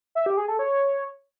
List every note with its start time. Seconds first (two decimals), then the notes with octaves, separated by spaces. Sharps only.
0.15 E5
0.26 G4
0.37 G#4
0.48 A4
0.59 C#5